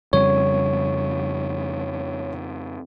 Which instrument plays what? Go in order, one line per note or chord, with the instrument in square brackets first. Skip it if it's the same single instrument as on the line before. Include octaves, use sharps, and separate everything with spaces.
[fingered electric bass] F2 C#3 G3 [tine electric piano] C#5